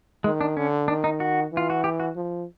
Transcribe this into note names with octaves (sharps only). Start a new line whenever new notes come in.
D#3 G#3
D4
D3 C#4
D#3 D4
D#4
F#4
E3 F4
F#4
G4
F#4
F3